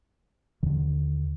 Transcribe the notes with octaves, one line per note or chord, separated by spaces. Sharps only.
D#2 D3 D#3